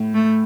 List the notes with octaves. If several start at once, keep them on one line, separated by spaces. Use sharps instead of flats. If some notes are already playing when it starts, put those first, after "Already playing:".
Already playing: A2
A3